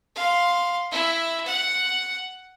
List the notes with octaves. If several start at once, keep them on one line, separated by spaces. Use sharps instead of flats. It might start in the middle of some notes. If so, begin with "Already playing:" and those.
F5 C6
E4 E5
F#5